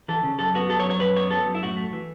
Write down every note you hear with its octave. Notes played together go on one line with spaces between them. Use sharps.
E3 A4
C#3
F#2 A4
B3 F#4
F#3 A4
C#5
F#2
C#5
F#2 B4
B3 C#5
F#3 A4
F#2
E4
A2 F#4
A3
E3